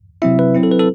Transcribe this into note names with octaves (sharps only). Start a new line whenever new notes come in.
C3 F#3 C4 E4 E5
B4
F#3 C4 E4
A4
B4
A4